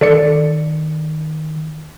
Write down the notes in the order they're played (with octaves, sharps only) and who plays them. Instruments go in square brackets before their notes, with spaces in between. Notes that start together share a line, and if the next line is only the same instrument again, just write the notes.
[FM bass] D#3 [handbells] A4 D5 C#7